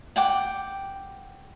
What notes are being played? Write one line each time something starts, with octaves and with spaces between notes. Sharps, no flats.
F#5 G5 D6